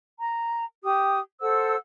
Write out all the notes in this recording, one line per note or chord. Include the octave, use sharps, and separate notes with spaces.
A#5
G4 D#6
A4 C5 F#5 E6